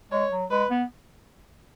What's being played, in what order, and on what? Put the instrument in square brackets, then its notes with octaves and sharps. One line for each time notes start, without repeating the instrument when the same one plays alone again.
[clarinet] G#3 [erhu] C#5
[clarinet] F#3
[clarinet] G#3 [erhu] B4
[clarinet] B3